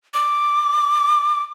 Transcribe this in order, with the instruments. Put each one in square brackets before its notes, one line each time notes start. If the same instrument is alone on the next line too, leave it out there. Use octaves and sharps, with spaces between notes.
[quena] D6